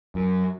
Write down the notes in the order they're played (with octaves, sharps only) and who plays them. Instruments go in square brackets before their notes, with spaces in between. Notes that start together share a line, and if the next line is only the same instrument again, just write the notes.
[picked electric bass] F#2